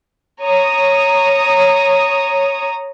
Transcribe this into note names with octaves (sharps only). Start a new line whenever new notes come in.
C#5 A#5 D#6